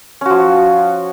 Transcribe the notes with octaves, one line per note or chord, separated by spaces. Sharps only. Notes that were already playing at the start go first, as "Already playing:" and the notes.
F3 C#4 F#4